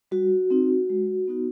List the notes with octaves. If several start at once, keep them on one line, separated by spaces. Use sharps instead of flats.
G3 F#4
C4 D#4
G#3
B3 D#4 F#4